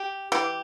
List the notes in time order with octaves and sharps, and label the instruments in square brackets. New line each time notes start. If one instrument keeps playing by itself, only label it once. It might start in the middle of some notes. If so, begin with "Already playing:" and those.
Already playing: [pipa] G4
[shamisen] E3 [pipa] G4